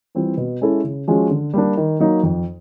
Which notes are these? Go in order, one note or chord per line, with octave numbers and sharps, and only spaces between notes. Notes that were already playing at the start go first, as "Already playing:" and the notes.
E3 G3 C4 F4
B2
G#3 C#4 E4 A4
C#3
F3 G#3 C#4 F#4
D3
G3 A#3 D4
D#3
F#3 A#3 D#4
F2